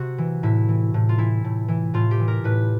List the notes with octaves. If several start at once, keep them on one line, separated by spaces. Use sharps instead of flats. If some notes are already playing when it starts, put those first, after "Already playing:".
Already playing: C3 F#4
E3
A2 E4
E3
A2
F4
E3 E4
A2
E3
A2 F4
G4
E3
A#4
A2 B4